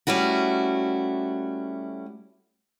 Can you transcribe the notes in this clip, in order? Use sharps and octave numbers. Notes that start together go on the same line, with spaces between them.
G3 A3 C#4 E4 F#4